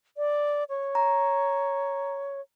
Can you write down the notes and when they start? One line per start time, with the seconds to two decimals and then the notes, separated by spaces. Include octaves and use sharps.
0.17 D5
0.69 C#5
0.95 A#5